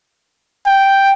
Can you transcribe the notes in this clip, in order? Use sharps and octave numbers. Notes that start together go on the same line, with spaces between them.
G5